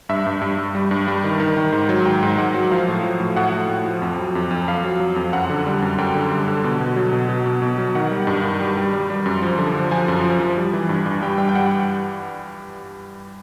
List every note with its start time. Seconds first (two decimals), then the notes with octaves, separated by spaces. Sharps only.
0.09 G2 E5
0.26 G2
0.41 G2
0.58 G2
0.75 G3
0.91 G2
1.08 G3
1.24 D#3
1.40 D#3
1.57 D#3
1.72 G#2
1.89 F#3
2.06 G#2 G5
2.23 G#2
2.38 G#2 F#5
2.54 F#3
2.72 F3 F5
2.88 A2
3.03 F3
3.20 A2
3.36 A2 F#5
3.53 A2
3.69 A2
3.86 F3
4.02 F2
4.19 F#3
4.35 F2
4.51 F2
4.68 F2 F5
4.84 F#3
5.00 F#3
5.16 F2
5.33 F#2 F#5
5.50 D3
5.66 G3
5.82 F#2
5.98 F#2 G5
6.15 D3
6.31 G3
6.48 D3
6.64 B2
6.80 B2
6.96 F#3
7.13 B2
7.29 B2
7.46 B2
7.62 B2
7.78 F#3
7.95 D#3 F#5
8.11 G3
8.27 G2
8.44 D#3
8.61 G3
8.77 G3
8.93 G3
9.10 G3
9.26 F#2
9.42 F3
9.58 D3
9.75 F3
9.91 F3 G#5
10.08 F#2
10.24 F3
10.40 F3
10.57 G3
10.73 E3
10.89 G2
11.06 G2
11.22 G3 G5
11.38 G2 G5
11.49 G5
11.55 G3 F#5